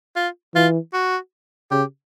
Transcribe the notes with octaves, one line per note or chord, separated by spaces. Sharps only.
F4
E3 F4
F#4
C#3 G4